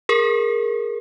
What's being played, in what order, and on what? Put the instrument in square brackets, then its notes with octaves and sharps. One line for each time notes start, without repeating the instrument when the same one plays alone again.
[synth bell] G#4 A#4